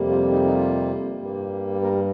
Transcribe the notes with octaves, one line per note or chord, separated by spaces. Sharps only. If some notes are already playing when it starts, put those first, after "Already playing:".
Already playing: F2 C3 G3 A#3
F4
D#4
D#4
F4
G2 G3 A#3
A#3 A#4